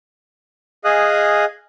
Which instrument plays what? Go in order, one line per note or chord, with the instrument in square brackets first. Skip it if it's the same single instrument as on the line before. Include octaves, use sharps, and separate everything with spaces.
[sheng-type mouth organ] G#4 D#5 F5 G#5 D#6 F#6